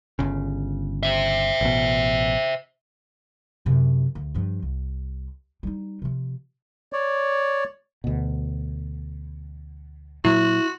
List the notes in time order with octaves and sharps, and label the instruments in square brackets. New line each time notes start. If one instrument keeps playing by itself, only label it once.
[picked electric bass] G1 C#3
[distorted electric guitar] C5 E5
[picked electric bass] A1 B2
[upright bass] F#2 C3
D2
G2 F3
C2
G3 D#4
C3 F3
[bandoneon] C#5 D5
[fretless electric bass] D2 B2
[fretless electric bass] A#2 F#3 [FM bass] E4 [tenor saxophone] F#4